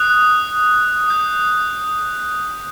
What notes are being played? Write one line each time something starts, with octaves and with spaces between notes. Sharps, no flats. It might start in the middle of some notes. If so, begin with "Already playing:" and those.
Already playing: D#6 F#6
D#6 G6